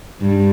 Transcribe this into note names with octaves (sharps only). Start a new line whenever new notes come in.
G2